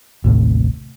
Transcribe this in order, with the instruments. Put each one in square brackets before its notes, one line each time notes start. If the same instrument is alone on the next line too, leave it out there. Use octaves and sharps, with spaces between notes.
[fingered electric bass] A1 D#2 A2 C3